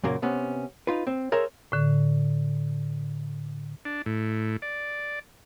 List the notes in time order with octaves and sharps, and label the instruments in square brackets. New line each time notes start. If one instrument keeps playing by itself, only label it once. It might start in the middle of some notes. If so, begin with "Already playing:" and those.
[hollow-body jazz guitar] F#2 A#2 C#3 A#3
C3 B3 C#4
D#4 F4 B4
C4
G#4 A#4 C5 C#5 E5
[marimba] A2 D3
[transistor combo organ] D4
A2
D5